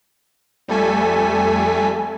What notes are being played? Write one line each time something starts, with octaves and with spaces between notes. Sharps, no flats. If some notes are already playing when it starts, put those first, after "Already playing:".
F2 G3 A3 A4 G#5 B6